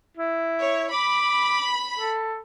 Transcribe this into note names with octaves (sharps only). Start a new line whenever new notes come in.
E4
C#5
B5 D6
A4